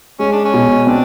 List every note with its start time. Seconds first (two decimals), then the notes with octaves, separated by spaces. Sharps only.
0.19 G#3 C#4
0.33 D4
0.45 C#4
0.54 B2
0.87 C4 D4